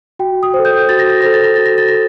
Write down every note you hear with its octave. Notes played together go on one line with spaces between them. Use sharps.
F#4 G5
D#6
C5
A4
G6
F#4 A6
A#6
A6
A4 C5 A#6
A6
A#6
F#4 A6
A#6
A6
A4 C5 A#6